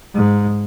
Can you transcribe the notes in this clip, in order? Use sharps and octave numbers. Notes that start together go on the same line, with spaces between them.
G#2